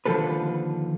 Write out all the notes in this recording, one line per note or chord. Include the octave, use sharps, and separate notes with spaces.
D#2 D3 F3 G#3 A4 B4